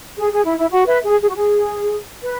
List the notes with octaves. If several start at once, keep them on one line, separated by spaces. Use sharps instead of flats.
G#4
G#4
E4
E4
F#4
B4 E5
G#4
G#4
F#4
G#4
B4